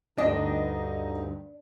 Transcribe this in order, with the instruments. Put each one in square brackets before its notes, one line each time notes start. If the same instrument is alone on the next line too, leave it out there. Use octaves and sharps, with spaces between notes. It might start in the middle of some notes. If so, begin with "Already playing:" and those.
[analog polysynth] D2 G2 [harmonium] D3 D#4 [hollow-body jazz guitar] D4 [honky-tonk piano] D#5